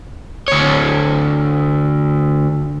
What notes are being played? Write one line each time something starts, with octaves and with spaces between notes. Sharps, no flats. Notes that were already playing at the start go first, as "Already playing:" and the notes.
D2 C#5